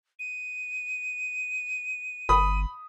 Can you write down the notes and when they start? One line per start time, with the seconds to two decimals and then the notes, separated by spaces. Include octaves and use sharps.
0.19 D#7
2.29 G1 B5 D#6